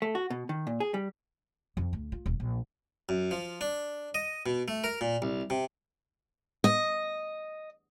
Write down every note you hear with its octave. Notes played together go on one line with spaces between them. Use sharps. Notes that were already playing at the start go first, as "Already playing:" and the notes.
A3
F#4
B2
D#3
A#2
G#4
G3
F2
D2
F4
D#1
A#1
F#2
F3
D4
D#5
B2
A3
A#4
A#2
C2
C3
D#5